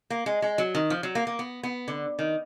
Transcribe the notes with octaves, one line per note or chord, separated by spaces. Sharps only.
A#3
G#3
G#3
F#3
D#3
F3
F#3
A#3
A#3
B3
B3
D3
D#3